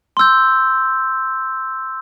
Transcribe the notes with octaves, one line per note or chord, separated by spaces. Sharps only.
C6 E6 G6